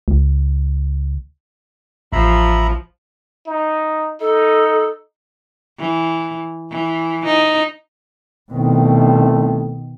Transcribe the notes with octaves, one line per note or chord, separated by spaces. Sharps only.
C#2
A1 F3 E5 A#5 B5
D#4
D#4 A4
E3
E3
D#4
C2 B2 D#3 A3 C4